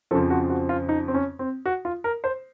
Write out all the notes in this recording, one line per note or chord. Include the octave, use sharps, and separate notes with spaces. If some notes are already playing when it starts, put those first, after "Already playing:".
F2 C#3 F3 A4
F#4
F#4
F4
D#4
C4
C#4
C4
F#4
F4
A#4
C5